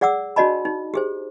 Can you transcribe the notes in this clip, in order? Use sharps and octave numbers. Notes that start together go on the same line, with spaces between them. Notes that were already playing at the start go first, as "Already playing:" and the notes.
G#4 D5 F#5 D6 E6
D4 F#4 D5 D#5 A5 B5
D#4
G4 G#4 C5